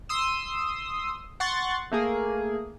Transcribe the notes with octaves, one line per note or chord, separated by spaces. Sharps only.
C6 D#6 E6
F#5 C6 C#6 A6
A3 A#3 G#4